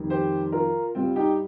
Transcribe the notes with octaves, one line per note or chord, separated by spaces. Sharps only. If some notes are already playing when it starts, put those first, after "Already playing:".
Already playing: F2 D#3 G3
G4 C5
F4 A#4
G2 G3 C4 F4
D#4 G4